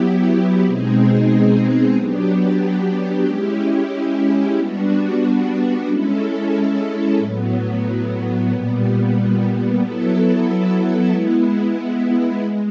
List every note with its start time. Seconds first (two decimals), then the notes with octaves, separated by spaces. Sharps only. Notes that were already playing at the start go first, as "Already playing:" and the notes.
Already playing: F#3 B3 E4 G4
0.62 B2 G#3 C4 D#4 G#4
1.94 F#3 B3 D4 G4
3.24 G#3 C#4 E4 G4
4.56 G3 B3 D4 F#4
5.86 G#3 C#4 E4 A4
7.18 A2 F#3 B3
8.48 A#2 G3 B3
9.79 F#3 B3 E4 A4
11.10 G#3 B3 E4
12.41 G#3